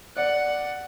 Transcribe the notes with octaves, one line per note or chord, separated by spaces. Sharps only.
D5 F#5